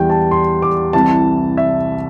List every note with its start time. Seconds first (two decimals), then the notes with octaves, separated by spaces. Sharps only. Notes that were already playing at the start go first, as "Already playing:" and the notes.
Already playing: E2 E3 G3 G5
0.10 A5
0.31 C6
0.62 D6
0.93 C2 C3 E3 A5
1.57 E5